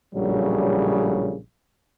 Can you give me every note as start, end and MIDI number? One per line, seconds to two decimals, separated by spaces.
0.14 1.37 34
0.14 1.37 45
0.14 1.37 49
0.14 1.37 54
0.14 1.37 55